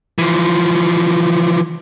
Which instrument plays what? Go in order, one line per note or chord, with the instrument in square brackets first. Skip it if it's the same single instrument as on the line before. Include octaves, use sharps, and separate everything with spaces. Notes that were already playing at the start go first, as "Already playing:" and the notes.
[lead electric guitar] E3 F3